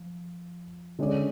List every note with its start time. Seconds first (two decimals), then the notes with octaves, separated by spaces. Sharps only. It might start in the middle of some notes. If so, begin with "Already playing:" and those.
Already playing: F3
0.99 D3 G#3 C#4 G#4 D5